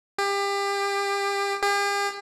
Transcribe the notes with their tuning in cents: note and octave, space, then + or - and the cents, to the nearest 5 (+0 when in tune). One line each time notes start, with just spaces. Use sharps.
G4 +30
G4 +45